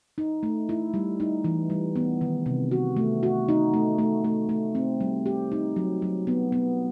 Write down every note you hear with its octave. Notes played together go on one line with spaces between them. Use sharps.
D#4
A3
E4
G3
D#4
E3
G3
B3
D#3
C3
F#4
A3
F#4
D#4
A3
A3
A3
A3
C4
G3
G4
D#4
F#3
F#3
B3
B3